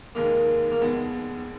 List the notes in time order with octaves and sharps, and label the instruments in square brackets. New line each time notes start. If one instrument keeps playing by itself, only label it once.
[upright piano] F1 D#2 D#3 G#3 [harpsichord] A#3
[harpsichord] A#3
[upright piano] F1 D#2 D#3 G#3 [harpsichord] B3